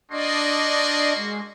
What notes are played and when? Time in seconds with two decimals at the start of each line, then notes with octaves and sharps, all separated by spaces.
0.11 A#3 D4 F#4 D5 D#5 C6
1.16 G#3